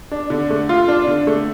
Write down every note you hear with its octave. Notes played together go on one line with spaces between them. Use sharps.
D4
D3
A3
F4
D4
D3
A3